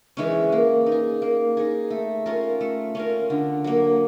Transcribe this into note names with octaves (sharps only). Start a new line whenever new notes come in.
E3 G#3 C#4
A#3
D#4
G#4
A#3
D#4 G#4
A3
C#4 F4 A#4
A3
C#4 F4 A#4
D3
F#3 A#3